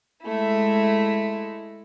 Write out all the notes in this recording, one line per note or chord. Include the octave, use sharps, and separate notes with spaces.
G#3 A3 E4